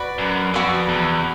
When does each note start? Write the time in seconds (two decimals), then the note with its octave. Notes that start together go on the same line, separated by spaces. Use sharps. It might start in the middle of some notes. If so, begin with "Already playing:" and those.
Already playing: F#4 B4 D5
0.18 F#2
0.54 F2 F#4 B4 D5
0.89 E2